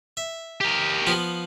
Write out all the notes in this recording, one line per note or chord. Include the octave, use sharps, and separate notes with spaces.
E5
G4 A#4
F3 B3 F4